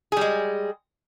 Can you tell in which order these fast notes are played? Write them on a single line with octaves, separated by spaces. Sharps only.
G#4 G3 G#3